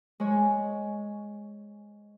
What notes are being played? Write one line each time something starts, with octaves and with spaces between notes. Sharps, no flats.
G#3 C#5